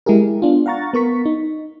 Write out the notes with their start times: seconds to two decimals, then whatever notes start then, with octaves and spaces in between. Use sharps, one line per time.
0.06 G#3 E4 G4 G#4 A#4
0.42 B3 D4 F4
0.66 F5 F#5 A#5 C#6 A6
0.93 B3 A#4 C#6 B6
1.26 D#4